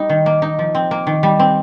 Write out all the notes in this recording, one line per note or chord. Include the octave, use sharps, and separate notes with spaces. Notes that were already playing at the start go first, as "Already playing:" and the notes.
Already playing: G3 D#4
D#3
A#3
D#4
F3
C4
A#3
D#3
G3
C4